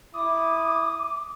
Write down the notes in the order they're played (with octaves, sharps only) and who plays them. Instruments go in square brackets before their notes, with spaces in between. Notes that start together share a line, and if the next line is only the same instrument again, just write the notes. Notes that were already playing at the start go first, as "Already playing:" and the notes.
[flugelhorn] E4 [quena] D6 [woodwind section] D#6